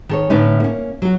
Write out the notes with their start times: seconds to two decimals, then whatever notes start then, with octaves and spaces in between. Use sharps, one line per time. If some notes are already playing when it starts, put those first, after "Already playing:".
0.09 D#3 A4 C#5
0.30 A2 D3 B3 C#4 D#4
0.60 A#3 C#4
1.02 F#3 F#4